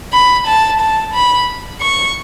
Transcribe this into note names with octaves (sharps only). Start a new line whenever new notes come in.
B5
A5
A5
B5
C#6